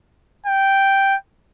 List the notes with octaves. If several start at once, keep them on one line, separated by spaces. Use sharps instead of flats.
G5